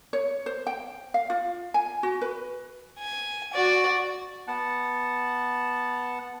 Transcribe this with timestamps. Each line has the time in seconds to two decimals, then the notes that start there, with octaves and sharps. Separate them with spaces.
0.13 C#5
0.46 C5
0.67 G5
1.14 F5
1.30 F4
1.74 G#5
2.03 F#4
2.21 B4
2.99 G#5
3.54 F#4 D5
4.48 B3 F#5 A5